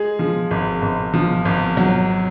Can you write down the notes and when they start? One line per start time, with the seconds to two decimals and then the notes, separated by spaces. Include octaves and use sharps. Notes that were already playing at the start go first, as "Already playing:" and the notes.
Already playing: G#3 G#4
0.19 F3
0.51 G#1
0.82 G#1
1.14 F3
1.45 G#1
1.77 F#3